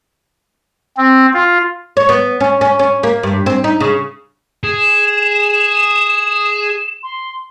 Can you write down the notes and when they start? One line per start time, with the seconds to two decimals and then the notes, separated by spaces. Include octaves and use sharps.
0.97 C4
1.33 F4
1.97 C#5
2.09 B3
2.40 C#4
2.61 C#4
2.79 C#4
3.03 A#3
3.23 G2
3.46 C4
3.64 D#4
3.80 C#3
4.64 G#4 E7
7.03 C6